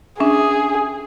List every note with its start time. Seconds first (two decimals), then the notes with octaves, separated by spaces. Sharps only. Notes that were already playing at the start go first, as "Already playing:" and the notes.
0.20 C#4 D4 G#4 E5